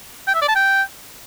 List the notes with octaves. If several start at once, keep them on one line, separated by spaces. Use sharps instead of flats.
G5
E5
D5
A5
G5